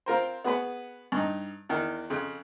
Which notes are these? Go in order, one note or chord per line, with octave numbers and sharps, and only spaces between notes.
C4 F4 A#4 C5
B3 F#4 G#4 B4
G2 D#4
E2 D#3
F2 C#3